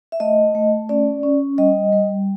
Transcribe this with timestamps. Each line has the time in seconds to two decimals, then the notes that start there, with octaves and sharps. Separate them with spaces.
0.12 E5
0.20 A3 D#5
0.55 A3
0.89 C#4 D5
1.23 C#4
1.58 G3 D#5
1.92 G3